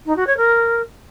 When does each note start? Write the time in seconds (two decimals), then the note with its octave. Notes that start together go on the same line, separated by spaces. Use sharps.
0.06 D#4
0.16 F#4
0.27 C#5
0.37 A#4